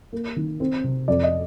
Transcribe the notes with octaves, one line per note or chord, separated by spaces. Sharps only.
A#3
D#3
C4
C3
F2 D5
D#5